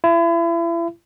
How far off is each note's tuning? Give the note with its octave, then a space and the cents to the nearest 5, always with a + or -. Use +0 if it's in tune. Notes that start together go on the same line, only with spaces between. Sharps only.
E4 +35